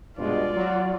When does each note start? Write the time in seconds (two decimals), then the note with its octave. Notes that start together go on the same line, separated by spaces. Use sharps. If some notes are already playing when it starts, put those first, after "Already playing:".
0.18 G2 B2 G#3 F4 D5
0.56 F#3